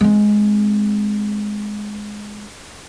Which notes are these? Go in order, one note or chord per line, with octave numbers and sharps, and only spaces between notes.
G#3 C4